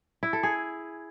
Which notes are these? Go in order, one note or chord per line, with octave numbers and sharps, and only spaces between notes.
E4
A4
G#4